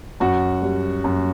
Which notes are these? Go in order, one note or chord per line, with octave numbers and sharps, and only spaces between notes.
F#2 F#4
G3
F#2